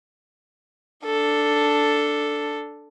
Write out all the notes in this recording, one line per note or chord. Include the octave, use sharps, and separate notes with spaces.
D4 A4